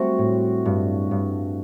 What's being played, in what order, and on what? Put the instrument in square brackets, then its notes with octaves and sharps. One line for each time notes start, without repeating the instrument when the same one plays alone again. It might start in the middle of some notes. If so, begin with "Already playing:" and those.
Already playing: [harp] G3 [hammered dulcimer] A3 C4 F#4
[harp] A2
G2
G2